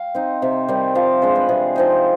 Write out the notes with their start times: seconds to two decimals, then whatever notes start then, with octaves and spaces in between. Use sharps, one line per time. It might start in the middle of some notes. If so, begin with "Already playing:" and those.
Already playing: F5 G5
0.15 C4 D#4
0.42 C3
0.68 D#3 G3 C4
0.95 F3 F5
1.22 G#3 D4 C5
1.36 B4
1.49 C3 G#4
1.76 F3 C4 D#4